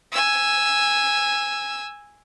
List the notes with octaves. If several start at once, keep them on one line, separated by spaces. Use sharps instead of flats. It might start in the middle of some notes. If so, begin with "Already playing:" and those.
G#5 E6